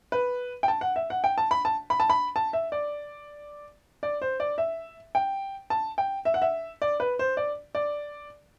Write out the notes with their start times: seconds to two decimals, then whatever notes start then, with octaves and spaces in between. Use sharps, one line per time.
0.12 B4
0.63 G5
0.68 A5
0.81 F#5
0.96 E5
1.10 F#5
1.24 G5
1.38 A5
1.51 B5
1.65 A5
1.90 B5
2.00 A5
2.10 B5
2.36 A5
2.53 E5
2.72 D5
4.03 D5
4.22 C5
4.40 D5
4.58 E5
5.15 G5
5.70 A5
5.98 G5
6.25 E5
6.34 F#5
6.42 E5
6.82 D5
7.00 B4
7.19 C5
7.37 D5
7.75 D5